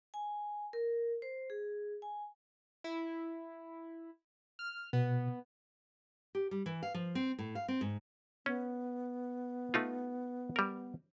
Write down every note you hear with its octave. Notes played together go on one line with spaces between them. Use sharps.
G#5
A#4
C5
G#4
G#5
E4
F6
B2 B3
G4
G3
E3
F5
F3
C4
A2
F5
C4
G#2
B3 C#4
A3 D#4 F4
G3 A#4